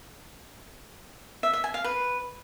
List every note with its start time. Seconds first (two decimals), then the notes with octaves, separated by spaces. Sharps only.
1.43 E5
1.53 E5
1.64 G#5
1.74 F5
1.84 B4